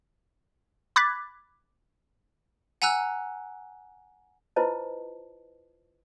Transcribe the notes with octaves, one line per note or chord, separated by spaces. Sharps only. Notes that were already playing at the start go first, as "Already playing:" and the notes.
B5 D6 F#6 G#6 A6 B6
F#5 G#5 A#5 E6 F#6
E4 F4 B4 C5 D#5 A5